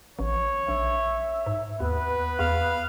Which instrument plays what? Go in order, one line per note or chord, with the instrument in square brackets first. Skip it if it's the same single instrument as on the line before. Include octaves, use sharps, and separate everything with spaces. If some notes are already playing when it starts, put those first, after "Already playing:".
[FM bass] A1 [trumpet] C#5
[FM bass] A#1 [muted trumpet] E5
[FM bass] G#2
[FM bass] D#2 [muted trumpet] B3 [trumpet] B4
[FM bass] E2 [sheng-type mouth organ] F5